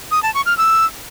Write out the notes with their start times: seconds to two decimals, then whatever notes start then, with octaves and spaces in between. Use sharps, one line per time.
0.11 D#6
0.23 A5
0.34 C#6
0.46 F6
0.58 E6